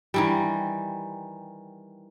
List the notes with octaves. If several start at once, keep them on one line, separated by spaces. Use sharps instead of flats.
D#3 E3 G3